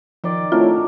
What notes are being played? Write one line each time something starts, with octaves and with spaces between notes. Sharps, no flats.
D#3 F3 D5 G5
F#3 A3 C4 D4 E4 F4 A4 A#4